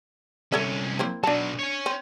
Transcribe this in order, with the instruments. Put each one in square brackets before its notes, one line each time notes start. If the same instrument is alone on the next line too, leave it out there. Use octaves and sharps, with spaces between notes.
[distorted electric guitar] C2 C#4 [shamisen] A4 C#5 E5
[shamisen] A#3 C4 E4
[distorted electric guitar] B2 F#3 [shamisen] D4 A5
[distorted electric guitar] C#5 G#5
[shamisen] C4